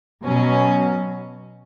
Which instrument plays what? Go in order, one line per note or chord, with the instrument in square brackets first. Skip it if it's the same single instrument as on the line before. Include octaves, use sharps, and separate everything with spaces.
[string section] B2 F#3 C#4